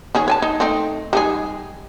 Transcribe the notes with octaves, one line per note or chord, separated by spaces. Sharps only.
D#3 C#4 G#4
C#5 G#5 A5
D#4
A3 C4 D#4
G3 D#4 G#4